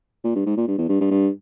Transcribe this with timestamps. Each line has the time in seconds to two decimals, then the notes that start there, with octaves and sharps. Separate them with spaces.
0.24 A#2
0.35 G2
0.46 G#2
0.57 A#2
0.68 G2
0.78 E2
0.89 G2
1.01 G2
1.11 G2